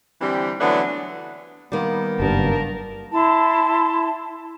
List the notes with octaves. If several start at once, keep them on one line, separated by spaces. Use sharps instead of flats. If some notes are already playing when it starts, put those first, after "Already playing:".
D3 E3 G3 C4
D3 E3 F#3 A3 B3 D4
D#3 G3 A#3 B3
F#1 G2 A#4 A5
E4 A5 C6